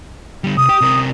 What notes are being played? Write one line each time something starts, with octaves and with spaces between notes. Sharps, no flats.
D3 G3
C2 D#6
G4
C3 A#4